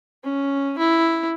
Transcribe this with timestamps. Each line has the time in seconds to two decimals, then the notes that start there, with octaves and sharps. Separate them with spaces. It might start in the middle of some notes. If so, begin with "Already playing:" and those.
0.24 C#4
0.78 E4